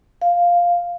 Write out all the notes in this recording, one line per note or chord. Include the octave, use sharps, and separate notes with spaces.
F5